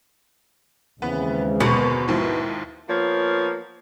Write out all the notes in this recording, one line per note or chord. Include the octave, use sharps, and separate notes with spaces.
D#2 C#3 E3 G#3 B3 C4
G1 F#2 B2 B4
D#2 G#2 F3 E4
F3 A#3 B3 C#5